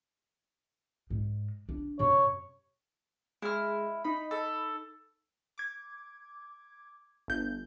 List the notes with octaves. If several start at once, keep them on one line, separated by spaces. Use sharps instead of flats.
G#2
D4
F#2 C3 C#5
G#3 E4 F6
D#4 B5
A4
D6 G#6
G1 G6